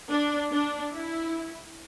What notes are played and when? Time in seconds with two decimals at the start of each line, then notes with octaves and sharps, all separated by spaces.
0.10 D4
0.51 D4
0.93 E4